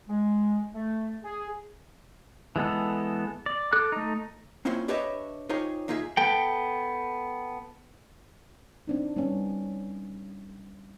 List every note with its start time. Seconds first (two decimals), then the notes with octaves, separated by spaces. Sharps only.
0.07 G#3
0.74 A3
1.23 G#4
2.56 E3 G#3 B3 A4
3.46 D5
3.73 A4 D6 F#6
3.92 A3 D#4
4.65 A#3 C4 C#4 E4 F4 C5
4.88 D4 G4 B4 C#5 D#5 E5
5.49 D#4 F4 G4 G#4 C5 C#5
5.88 E2 D#4 F4 G#4 E5
6.17 B3 A4 G5
8.88 C4 D4 D#4
9.16 G3 B3 C#4